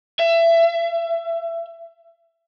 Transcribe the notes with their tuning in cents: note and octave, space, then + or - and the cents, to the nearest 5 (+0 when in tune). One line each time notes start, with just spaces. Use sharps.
E5 +25